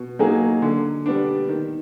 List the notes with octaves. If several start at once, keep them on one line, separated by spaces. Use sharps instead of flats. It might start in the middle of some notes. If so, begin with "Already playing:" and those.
Already playing: B2
F#3 A#3 D#4 G#4
D3
G3 B3 D4
D#3